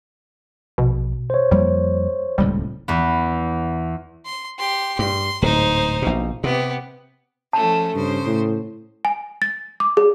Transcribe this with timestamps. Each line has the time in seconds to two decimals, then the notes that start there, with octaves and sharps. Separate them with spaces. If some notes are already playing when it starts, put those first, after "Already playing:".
0.78 A#1 B2
1.30 C5 C#5
1.51 F2 F3 G3 A#3
2.38 D#1 C#2 A2 G3
2.88 E2 B3
4.25 C6
4.59 G4 C6
4.99 G2 C6
5.42 D1 G#2 D#4 C5
6.02 A#1 B2
6.44 C3 B3 G4
7.53 F3 A3 C#4 A5
7.95 G2 C#3 C5
8.26 A2
9.05 G#5
9.42 A6
9.80 D6
9.97 G#4